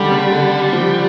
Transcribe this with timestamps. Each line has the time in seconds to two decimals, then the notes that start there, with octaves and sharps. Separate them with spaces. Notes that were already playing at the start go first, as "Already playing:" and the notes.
Already playing: D3 D#3 G3
0.11 C#3
0.30 D3
0.73 F3